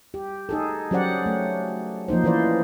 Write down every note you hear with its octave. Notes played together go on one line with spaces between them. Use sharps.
G4
D#4 G#4 A4
F#3 C#4 G4 C5 D5 F#5
A3
F3 A#3 D#4 C5
E3 C#4 B4 C5 D5